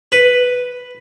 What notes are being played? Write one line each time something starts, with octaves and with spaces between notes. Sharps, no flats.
B4